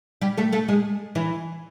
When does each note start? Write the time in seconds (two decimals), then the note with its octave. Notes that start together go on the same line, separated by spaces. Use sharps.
0.21 G3 G4
0.37 A3 A4
0.52 A3 A4
0.68 G#3 G#4
1.15 E3 E4